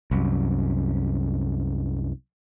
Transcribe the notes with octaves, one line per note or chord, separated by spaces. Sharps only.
C2 F#2